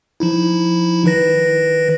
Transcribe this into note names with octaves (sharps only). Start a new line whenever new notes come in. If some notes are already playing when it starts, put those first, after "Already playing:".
F3 D#4 E4
D#3 B4 A#6